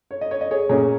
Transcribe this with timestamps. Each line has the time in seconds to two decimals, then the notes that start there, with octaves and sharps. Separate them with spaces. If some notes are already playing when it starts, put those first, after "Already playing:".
0.11 C#5
0.21 D#5
0.31 C#5
0.41 D#5
0.51 G#4 C#5
0.69 A#2 A#3 C#4 G#4 C#5